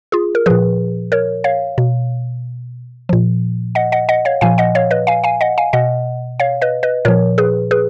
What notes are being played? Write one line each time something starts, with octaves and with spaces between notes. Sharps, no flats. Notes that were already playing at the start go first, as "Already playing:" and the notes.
F4 G#4
A#4
A#2 F3 G#4 B4
A#4 C#5
C#5 F5
B2
A#2 F3
D#5 F#5
D#5 F#5
D#5 F#5
C#5 F5
A#2 F3 F5 G#5
D#5 F#5
C#5 F5
B4 D#5
F5 G#5
F5 G#5
D#5 F#5
F5 G#5
B2 D#5 F#5
C#5 F5
B4 D#5
B4 D#5
A#2 F3 A#4 C#5
G#4 B4
G#4 B4